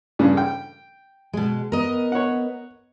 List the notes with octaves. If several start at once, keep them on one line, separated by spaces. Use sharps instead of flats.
G2 C#3
G5
B2 G#3
B3 A#4 D#5
C#5 F#5